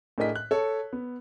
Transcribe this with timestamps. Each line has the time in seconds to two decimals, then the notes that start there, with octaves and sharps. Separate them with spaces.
0.18 A2 D4 G#4 A#4 D#5 B6
0.36 F#6
0.51 A4 C#5
0.93 B3